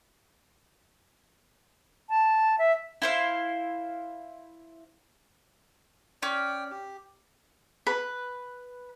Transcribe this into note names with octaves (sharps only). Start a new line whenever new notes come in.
A5
E5
E4 C5 F5
C#4 D5 G5
G4
B4